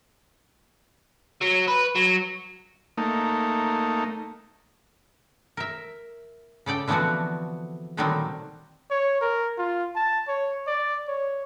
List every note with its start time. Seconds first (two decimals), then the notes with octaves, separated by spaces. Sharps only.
1.41 F#3
1.67 B4
1.95 F#3
2.97 A3 A#3 D#4
5.57 A#4 E5
6.66 C#3 A4 D5 G5
6.88 D3 E3 F3 B3 C4 F#4
7.97 A#2 D3 D#3 F#3 G3 C4
8.91 C#5
9.21 A#4
9.58 F4
9.95 A5
10.28 C#5
10.67 D5
11.08 C#5